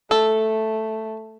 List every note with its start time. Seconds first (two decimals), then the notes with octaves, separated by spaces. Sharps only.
0.11 A3 A4